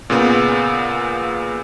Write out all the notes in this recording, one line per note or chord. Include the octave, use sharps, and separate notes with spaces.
A#2 C#3 B3